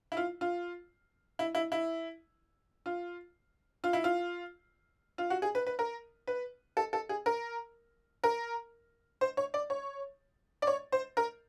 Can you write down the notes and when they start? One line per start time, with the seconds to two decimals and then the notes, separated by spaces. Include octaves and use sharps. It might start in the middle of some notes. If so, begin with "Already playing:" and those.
0.12 E4
0.17 F4
0.41 F4
1.39 E4
1.55 E4
1.72 E4
2.86 F4
3.84 F4
3.93 E4
4.04 F4
5.18 F4
5.30 F#4
5.42 G#4
5.55 B4
5.67 B4
5.79 A#4
6.27 B4
6.77 A4
6.93 A4
7.09 G#4
7.26 A#4
8.24 A#4
9.21 C5
9.37 C#5
9.54 D5
9.70 C#5
10.62 D5
10.67 C#5
10.92 C5
11.17 A#4